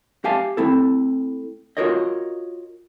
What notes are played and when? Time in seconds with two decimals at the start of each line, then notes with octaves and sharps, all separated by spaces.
0.24 G4 E5 F5 G#5 A5
0.57 A3 C4 E4 A4
1.77 F4 F#4 A#4 C#5 D#5